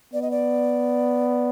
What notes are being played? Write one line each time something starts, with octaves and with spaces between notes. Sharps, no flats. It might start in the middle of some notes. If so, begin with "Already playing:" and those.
B3 D5
D#5
D5